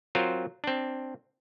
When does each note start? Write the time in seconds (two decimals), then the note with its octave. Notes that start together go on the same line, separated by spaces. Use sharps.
0.15 F#3 C4 F4 A#4 C5
0.64 C4 D4